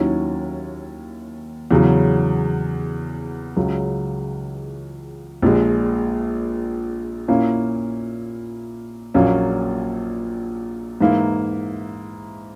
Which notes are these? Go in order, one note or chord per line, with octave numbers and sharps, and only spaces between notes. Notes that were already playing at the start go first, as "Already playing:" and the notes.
Already playing: D#2 D#3 F#3 C#4 E4
E2 C#3 F#3
C#2 C#3 F#3
A#1 A#2 G#3
A#2 A#3 C#4 E4
A#1 A#2 F#3 A#3 C#4
G#2 E3 A#3 E4